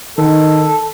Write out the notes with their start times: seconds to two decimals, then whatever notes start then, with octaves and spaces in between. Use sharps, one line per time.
0.18 D#3 A4